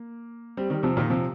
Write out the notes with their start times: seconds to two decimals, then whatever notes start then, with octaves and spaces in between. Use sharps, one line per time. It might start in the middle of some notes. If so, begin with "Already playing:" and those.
Already playing: A#3
0.57 G3 C4
0.70 D#3 G3
0.83 C3 F3
0.97 A#2 D#3
1.10 C3 F3